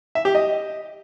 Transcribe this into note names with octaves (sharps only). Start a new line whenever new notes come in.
E5
G4
D#5